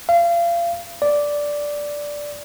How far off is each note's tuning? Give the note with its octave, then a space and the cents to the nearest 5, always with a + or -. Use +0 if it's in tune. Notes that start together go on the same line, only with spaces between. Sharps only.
F5 -30
D5 -5